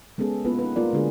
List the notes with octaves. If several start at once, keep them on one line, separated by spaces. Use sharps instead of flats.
G#3 B3 C#4 G#4 A4
A#3 B3 C#4 E4 F4 B4
D#4 B4
A3 A#3 F4 A#4 D5
D3 G#3 D4 F#4 G#4